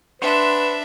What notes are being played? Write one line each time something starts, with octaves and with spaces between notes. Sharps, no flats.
D4 B4 C5 E5 F#5 C6